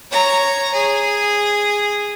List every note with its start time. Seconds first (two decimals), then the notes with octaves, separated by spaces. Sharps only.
0.11 C#5 A#5
0.74 G#4